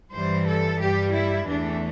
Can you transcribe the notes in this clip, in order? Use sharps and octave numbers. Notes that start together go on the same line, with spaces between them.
G2 E3 G3 C5
A4
G2 G3 G4
E4
E2 E3 A3 D4